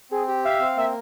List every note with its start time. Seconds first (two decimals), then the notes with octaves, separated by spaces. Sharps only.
0.11 C4 G#4
0.27 G4
0.44 E5 F5
0.60 C4
0.77 A#3 E5